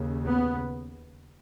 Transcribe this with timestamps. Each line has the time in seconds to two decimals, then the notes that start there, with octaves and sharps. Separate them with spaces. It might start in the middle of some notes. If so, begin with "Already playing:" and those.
Already playing: D#2 C#3
0.27 B3